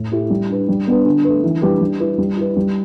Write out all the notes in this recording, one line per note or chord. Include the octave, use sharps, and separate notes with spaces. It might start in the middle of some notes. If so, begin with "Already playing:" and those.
Already playing: A2
A3 E4 G4
G3
D4 B4
G3
B3 D4 B4
D3
A3 D4 B4
E3
G3 D4 G4 B4
G3
E4 B4
G3
E4 B4
G3